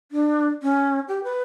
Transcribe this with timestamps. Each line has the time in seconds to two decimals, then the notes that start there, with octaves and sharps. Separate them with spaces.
0.12 D4
0.63 C#4
1.08 G4
1.24 B4